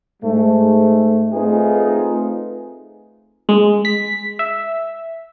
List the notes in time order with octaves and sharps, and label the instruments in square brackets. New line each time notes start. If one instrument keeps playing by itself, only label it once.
[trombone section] G#2 G#3 A3
A3 C4 D#4 F4 G#4 B4
[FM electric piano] G#3
B6
E5